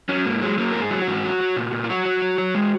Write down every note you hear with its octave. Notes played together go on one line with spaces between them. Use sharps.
F#3 C#4
G#2 A#3
F#3 G#3
F#3 A#3
G#2 A#4
G#4
F#3
F#4
G#2
F#3
F#3
A#2
A#2
F4
F#3 F#4
F#3
F#3
F#3
G#3